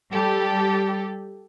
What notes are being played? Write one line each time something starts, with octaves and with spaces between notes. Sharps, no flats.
G3 G4 A4